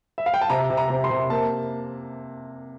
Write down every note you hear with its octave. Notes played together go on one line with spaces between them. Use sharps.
E5
F5
G5
A5
C3 A#5
C3
A#5
C3
C6
C3
A#3 A5